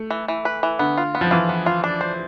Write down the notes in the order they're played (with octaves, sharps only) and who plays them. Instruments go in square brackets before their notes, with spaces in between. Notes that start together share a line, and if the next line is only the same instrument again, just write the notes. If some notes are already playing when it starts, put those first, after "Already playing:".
Already playing: [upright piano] A3
[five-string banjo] E3
E3
B4
E3
[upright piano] D3 [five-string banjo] B3
[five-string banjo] F4
B3
[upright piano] F3
[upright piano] E3 [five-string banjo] F4
[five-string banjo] B3
F4
D4
C5